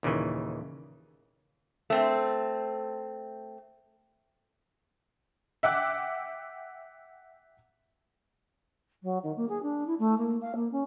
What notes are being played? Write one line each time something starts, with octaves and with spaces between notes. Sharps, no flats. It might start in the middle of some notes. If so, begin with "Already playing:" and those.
D#2 A#2 C#3 E3
A3 C4
E5 F#5 G5 D6 F#6
F#3
D#3
A#3
G#4
D4
E4
A3
A#3
F5
A#3
C#4